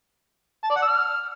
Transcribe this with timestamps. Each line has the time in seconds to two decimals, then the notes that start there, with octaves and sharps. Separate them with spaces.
0.64 A5
0.70 D5
0.76 F#5
0.82 E6
0.88 F6